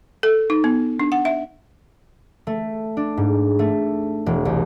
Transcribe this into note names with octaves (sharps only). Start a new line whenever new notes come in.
A4
D#4
B3
D4
F#5
E5
A3
D4
G#2
A3
E1
C2